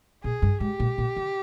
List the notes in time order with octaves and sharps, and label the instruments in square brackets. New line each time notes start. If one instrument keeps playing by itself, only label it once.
[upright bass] A#2 [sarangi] G#4
[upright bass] G2
[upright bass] G#2 [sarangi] G4
[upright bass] A#2
A#2
D3